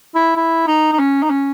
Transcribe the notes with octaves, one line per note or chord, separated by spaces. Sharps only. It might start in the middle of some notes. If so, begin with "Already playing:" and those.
E4
E4
D#4
D#4
C#4
D#4
C#4